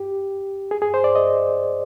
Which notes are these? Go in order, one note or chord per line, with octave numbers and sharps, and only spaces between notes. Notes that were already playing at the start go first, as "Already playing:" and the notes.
Already playing: G4
G#4
G#4
C5
D5
D#5